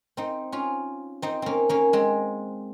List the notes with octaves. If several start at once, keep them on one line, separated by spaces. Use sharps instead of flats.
C4 D#4
C#4 F4
C4 D#4
A#3 C4 C#4
A#3 C#4
G#3 C4